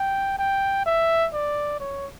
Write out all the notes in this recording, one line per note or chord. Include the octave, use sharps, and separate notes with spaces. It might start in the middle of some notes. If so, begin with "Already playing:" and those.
Already playing: G5
G5
E5
D5
C#5